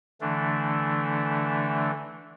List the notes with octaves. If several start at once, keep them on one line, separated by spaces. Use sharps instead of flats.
D3 E3 A3 D4